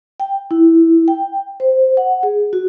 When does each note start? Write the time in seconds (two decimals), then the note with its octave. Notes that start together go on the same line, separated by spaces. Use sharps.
0.20 G5
0.51 E4
1.08 G5
1.60 C5
1.97 F#5
2.23 G#4
2.53 F#4